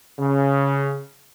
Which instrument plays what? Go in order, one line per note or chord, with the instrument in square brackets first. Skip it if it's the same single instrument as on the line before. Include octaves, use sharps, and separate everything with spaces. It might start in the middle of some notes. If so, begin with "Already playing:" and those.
[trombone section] C#3